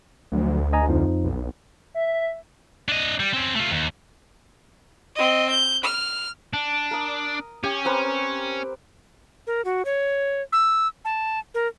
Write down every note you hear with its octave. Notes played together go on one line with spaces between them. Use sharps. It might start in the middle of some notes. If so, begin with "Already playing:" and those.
D2 F3 F#3 A3
D#5 G#5 A#5
F2 F3 D#4
B1
E5
D4 D#5
G3
C4 C#4
A3 F4
D#2
C4 D#5
G6
F6
D4
A#4 D#6
C#4 G4
C4 A#4 B4
A#4
F#4
C#5
E6
A5
A#4